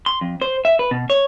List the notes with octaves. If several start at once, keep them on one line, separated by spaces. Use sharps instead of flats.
C6
F2
C5
E5
B4
B2
C#5